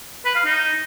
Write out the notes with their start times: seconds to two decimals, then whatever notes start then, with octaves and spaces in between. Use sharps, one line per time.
0.25 B4
0.35 F5
0.45 D#4